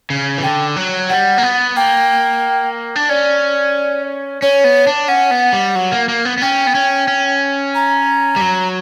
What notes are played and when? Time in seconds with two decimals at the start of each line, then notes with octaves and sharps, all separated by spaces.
0.10 C#3
0.38 E3
0.43 D3 G5
0.76 F#3
1.10 G3 F#5
1.38 A#3
1.43 B3
1.76 A#3 G5
2.96 D4
3.09 C#4 D5
4.42 C#4 C#5
4.64 B3
4.87 D4
5.08 C#4 F#5
5.31 B3
5.53 G3
5.75 F#3
5.92 A#3
6.08 A#3
6.25 B3
6.38 B3
6.42 C#4 G5
6.67 B3
6.75 C#4
7.08 C#4
7.75 A#5
8.36 G3
8.41 F#3